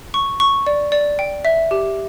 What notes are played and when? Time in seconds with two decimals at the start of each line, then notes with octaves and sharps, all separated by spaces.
0.14 C#6
0.40 C#6
0.67 D5
0.92 D5
1.19 G5
1.45 E5
1.71 G4